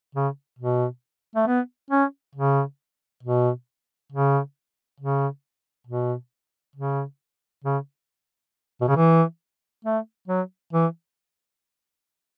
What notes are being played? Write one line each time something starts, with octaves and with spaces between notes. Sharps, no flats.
C#3
B2
A3
B3
C#4
C#3
B2
C#3
C#3
B2
C#3
C#3
B2
C#3
E3
A3
F#3
E3